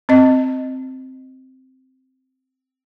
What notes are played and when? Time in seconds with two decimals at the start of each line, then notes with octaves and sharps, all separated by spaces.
0.09 C4 D#5